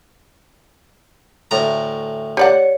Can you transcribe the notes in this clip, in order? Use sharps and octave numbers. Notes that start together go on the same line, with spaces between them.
D2 A2 A#5
G4 C#5 D5 F#5